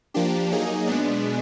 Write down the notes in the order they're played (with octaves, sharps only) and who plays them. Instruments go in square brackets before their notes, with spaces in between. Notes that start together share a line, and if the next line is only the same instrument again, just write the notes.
[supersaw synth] F3 A#3 D4 G4
F#3 A#3 D#4 G#4
B2 G#3 B3 D4